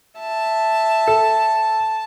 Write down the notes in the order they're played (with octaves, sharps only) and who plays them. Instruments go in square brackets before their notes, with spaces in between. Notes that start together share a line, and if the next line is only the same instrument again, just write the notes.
[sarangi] E5 [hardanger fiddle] A5
[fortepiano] A4